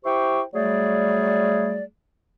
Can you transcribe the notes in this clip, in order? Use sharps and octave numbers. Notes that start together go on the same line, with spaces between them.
E4 G4 C5 G5 C#6
F#3 G3 A3 G#4 D5